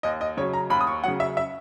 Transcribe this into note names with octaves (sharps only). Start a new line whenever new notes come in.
D#2 D#5
D#5
C#3 F#3 C#5
A#5
D#2 B5
D#6
C#6
C#3 F#3 F#5
E5
E5